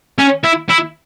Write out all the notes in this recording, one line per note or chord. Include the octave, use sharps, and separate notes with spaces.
C#4
E4
E4